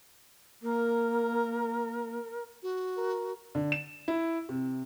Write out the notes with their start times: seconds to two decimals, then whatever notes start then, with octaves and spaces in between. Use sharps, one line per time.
0.62 A#3 A#4
2.63 F#4
2.97 A#4
3.55 D3
3.72 E7
4.08 E4
4.49 C3